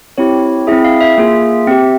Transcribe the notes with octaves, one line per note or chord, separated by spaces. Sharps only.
C4 E4 G4 C#5
C4 E4 G#4 E5
F5
E5
A#3 F4 G#4
C4 G4